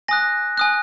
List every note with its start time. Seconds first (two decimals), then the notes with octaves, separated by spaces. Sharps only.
0.08 G#5 D#6 F#6 A#6
0.57 G#5 D#6 F#6